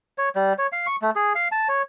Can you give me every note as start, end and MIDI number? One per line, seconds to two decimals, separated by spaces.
0.18 0.29 73
0.36 0.53 55
0.58 0.67 73
0.72 0.87 77
0.87 0.96 85
1.02 1.10 57
1.16 1.33 68
1.35 1.48 77
1.52 1.68 81
1.69 1.82 73